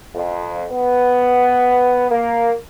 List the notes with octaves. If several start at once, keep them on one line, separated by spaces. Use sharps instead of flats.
F2
B3
A#3